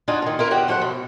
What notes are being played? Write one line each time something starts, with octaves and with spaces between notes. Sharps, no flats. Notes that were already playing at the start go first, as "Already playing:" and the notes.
D4 D#4 F4 F#4 G#5
A#2 D#3
E4 F4 A#4
E2 F#4 G4 F#5 G5
F3 A3 C5 F#5
B2